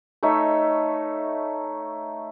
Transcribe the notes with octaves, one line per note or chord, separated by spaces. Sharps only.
A3 D#4 C#5 E5